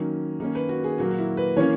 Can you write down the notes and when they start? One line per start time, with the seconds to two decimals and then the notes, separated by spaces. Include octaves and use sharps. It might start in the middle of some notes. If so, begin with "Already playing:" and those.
Already playing: D#3 F#3 A#3 C#4 D#4
0.40 D#3 A#3 C#4 D#4
0.55 B4
0.69 F#4
0.84 G#4
0.98 A#2 F#3 A#3 F#4
1.11 F#4
1.18 E4
1.37 B4
1.57 E3 A#3 C#4 C#5